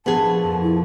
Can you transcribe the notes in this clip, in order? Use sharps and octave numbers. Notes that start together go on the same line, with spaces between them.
A#1 F3 B3 G#4 A5
F2
E4